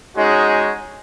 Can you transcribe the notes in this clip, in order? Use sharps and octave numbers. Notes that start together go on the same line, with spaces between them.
G#3 C#4 D#4 F#4 G#4 C#5